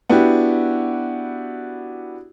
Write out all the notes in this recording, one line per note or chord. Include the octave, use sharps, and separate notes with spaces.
B3 D4 E4 F#4 G4